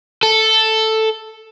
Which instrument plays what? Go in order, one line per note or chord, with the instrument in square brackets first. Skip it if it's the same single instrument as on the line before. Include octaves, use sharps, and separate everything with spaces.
[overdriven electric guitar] A4